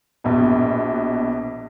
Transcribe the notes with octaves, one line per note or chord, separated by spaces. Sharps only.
A#1 B2